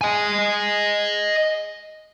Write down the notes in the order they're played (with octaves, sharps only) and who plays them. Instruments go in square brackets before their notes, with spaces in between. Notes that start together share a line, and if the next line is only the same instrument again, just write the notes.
[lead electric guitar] D#5 G#5